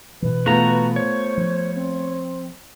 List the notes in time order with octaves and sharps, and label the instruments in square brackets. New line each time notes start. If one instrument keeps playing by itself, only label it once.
[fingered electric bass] B2 E3 [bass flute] B4
[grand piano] A3 B3 F4 [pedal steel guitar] F#4 A#5
[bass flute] C5 [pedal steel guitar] C#5
[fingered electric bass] F3
[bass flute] C4